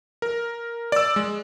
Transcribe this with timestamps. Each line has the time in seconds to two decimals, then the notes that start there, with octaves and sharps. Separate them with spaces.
0.22 A#4
0.92 D5 E6
1.16 G#3